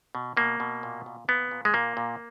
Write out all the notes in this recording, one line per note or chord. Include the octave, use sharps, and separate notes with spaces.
B2
B2 A#3
B2
A#2
A#2
A#2 B3
A#2
G#3
A#2 A#3
A#2